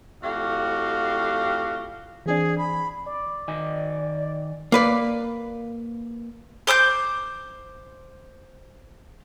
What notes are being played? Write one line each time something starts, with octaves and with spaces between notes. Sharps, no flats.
F2 A2 F#4 G4 F5
E3 C4 D4 G#4
B5
D5
D#3 D#5 G#5
A#3 B4 D5
C5 D6 D#6 G6